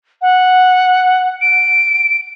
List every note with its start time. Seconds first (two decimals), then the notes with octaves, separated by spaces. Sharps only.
0.22 F#5
1.41 D7